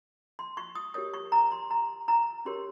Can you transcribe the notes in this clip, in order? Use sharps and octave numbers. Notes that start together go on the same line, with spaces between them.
C6
C#6
D#6
G4 A#4 C#5 D#6
C#6
A#5
C6
A#5
A#5
C#4 G4 A#4 C#5 C6